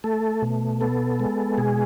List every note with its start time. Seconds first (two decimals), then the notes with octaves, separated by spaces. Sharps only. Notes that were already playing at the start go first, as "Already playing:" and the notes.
0.04 A3 A4
0.42 B2
0.81 B3 A4
1.20 G#3
1.58 B2 G#4